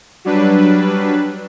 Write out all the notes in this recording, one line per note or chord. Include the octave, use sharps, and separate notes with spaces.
F#3 G3 D4 B4